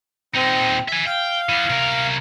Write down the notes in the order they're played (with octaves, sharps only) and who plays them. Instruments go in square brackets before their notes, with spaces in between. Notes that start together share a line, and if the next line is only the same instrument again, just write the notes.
[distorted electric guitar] A#2 D#4 [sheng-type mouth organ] C4
[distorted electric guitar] E5 G#5
[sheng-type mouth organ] F5 [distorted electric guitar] G5
[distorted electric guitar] E3 B3
C3 A#4